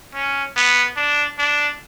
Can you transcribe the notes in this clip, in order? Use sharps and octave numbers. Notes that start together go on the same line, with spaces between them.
C#4
B3
D4
D4